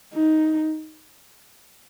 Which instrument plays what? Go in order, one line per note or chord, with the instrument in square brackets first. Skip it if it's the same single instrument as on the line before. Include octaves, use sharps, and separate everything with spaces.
[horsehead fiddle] D#4